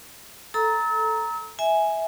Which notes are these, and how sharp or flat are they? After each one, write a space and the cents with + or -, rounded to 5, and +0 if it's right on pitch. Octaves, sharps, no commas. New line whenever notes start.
A4 +0 A#5 +0 E6 -40
E5 -15 G#5 +0